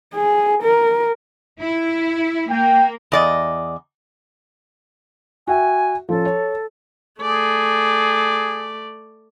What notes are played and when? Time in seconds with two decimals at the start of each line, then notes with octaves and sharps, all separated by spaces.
0.15 G#4
0.63 A#4
1.60 E4
2.50 A#3 G5
3.12 E2 D5 D#5
5.47 F#4 E5 G5 G#5
6.09 F3 C#4 A4
6.25 C#5
7.21 A3 G#4 D5